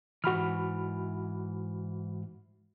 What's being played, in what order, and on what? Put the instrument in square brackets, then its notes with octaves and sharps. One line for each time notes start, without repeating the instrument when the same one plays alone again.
[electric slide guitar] G#2 E3 [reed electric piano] F#4 B5 F6